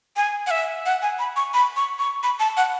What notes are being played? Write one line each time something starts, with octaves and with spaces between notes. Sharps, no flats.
G#5
F#5
E5
F#5
G#5
B5
C#6
B5
C#6
C#6
B5
A5
F#5